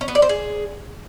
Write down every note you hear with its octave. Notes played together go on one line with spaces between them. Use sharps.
C#4
B3
D5
C5
G#4